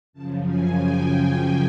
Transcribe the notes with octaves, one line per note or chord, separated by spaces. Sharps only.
F#2 C#3 F3 A5
G#5
G5
G5